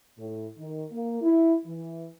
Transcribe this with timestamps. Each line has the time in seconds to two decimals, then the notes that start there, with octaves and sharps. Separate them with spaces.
0.18 A2
0.58 D#3
0.91 A#3
1.22 E4
1.66 E3